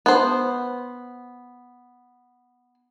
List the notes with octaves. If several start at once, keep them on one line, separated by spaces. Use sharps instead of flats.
B3 C5